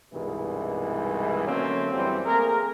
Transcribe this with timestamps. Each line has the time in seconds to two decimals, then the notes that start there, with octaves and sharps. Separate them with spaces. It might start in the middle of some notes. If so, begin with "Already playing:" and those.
0.12 C2 G2 B2 D#3 E3 G#3
1.45 D3 F#3 A3 A#3 C4 C#4
1.92 F#2 E3 G3 C4
2.24 A3 A#3 C4 G#4 A#4